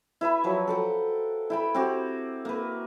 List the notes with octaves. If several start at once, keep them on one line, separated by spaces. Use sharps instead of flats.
E4 B4 E5 B5
F3 F#3 B4
A4 F#5 G5
E4 G5 B5
C4 F#4 G4
A#3 B4